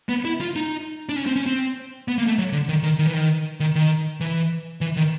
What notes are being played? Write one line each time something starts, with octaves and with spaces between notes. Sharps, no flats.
B3
E4
F4
D#4
D4
C#4
C4
C#4
C4
B3
A#3
A3
F#3
D3
D#3
D#3
D#3
E3
D#3
D#3
D#3
E3
E3
D#3